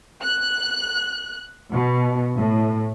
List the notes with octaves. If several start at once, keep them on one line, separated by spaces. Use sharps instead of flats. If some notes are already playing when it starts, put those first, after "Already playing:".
F#6
B2
A2